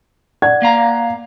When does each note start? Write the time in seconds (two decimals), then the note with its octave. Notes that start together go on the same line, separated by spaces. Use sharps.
0.42 D5 F#5 G#6
0.62 A#3 F5 A#5